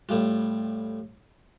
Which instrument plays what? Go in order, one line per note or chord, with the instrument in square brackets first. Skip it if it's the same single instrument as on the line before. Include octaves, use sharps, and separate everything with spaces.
[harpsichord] A2 G3 F4